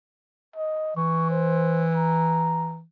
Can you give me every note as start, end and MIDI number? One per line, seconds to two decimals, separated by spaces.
0.56 0.92 75
0.96 2.83 52
0.96 1.25 85
1.30 1.86 72
1.95 2.77 82